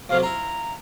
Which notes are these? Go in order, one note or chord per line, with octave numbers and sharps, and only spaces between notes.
F2 C3 F#3 F5
E4 F4 A#5